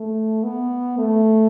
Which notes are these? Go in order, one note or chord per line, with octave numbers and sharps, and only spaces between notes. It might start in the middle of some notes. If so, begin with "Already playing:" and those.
Already playing: A3
B3
A3